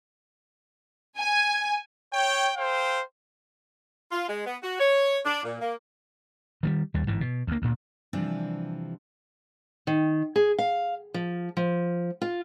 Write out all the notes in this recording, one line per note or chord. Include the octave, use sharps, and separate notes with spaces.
G#5
C#5 G5
A4 C5 F5 G5
F4
G#3
B3
F#4
C#5
D4
A#2
A#3
D#3 F#3 G3
D#2 G3
G1 G#2 E3
B2
D2 A#3
D2 A#2
C3 E3 F3 G3 C4 D4
D#3
G#4
F5
F3
F3
F4